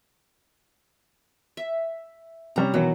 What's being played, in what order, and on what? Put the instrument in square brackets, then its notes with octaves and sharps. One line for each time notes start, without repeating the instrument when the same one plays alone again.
[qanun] E5
[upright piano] C3 G3 C#4 [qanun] A#5
[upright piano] B2 D#3 E3 [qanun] F#3